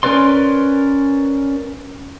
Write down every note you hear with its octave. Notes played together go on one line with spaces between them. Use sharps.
C#4 A#4 B4 D5 C6